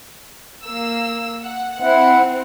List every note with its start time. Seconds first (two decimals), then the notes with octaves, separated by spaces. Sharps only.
0.64 A#3 E6
1.42 F#5
1.80 C4 E4 F#5